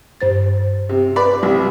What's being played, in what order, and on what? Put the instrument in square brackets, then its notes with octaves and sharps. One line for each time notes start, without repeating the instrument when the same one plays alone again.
[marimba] G2 C5 A6
[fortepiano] C3
B4 D5
C2 C3